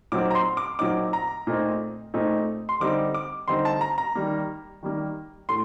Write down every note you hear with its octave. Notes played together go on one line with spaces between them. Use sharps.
A#2 F#3 C4 D#4 D6
A#5
C6
D6
A#2 F#3 C4 D#4 D6
A#5
A#2 A3 C4 D#4
A#2 A3 C4 D#4
C6
D3 G3 C4 D#4 D6
D6
D3 G3 C4 D#4 C6
A5
A#5
A#5
D#3 G3 A#3
D#3 G3 A#3
A2 A3 C6